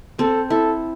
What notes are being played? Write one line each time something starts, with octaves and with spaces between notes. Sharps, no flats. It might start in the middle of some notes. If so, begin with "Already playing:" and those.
C4 A4
E4 A4